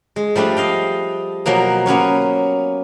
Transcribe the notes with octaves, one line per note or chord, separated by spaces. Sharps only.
G#3
F3 G3 A3 D4
D#5 F5 G5
B2 F3 F#3 A#3
A#3 B3 C#4 C#5